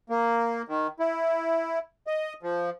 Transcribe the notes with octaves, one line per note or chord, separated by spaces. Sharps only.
A#3
D#3
E4
D#5
F3